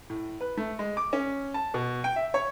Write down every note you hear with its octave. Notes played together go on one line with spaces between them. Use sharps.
A2
B4
A3
G#3
D6
C#4
A5
B2
G5
E5
C#5